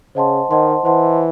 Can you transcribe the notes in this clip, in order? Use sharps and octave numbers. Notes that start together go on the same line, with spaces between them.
C#3 C5 D#5 F#5 A5 C6
D#3 C5 D#5 F#5 A5 C6
E3 C5 D#5 F#5 A5 C6